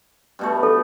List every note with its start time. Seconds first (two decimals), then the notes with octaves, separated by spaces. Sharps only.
0.39 G2 B2 A3
0.63 A4